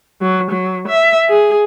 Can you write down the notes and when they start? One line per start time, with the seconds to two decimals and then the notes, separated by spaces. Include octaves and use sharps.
0.21 F#3
0.51 F#3
0.88 E5
1.29 G#4